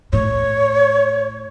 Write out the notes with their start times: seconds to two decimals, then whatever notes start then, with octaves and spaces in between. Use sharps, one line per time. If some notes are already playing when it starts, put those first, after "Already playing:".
0.13 A2 C#5